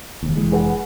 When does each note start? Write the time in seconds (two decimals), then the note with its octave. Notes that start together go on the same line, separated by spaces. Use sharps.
0.23 E1 D#2
0.36 F1 E3 G#3
0.52 G#4 B4 F#5